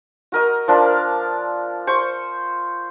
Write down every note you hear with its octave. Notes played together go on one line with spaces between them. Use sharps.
F#4 A#4 D#5
F3 D4 A#4
C5 C#6